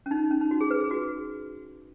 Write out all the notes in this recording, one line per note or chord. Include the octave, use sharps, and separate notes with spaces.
C#4
D#4
C#4
D#4
F#4
G#4
B4
G#4
F#4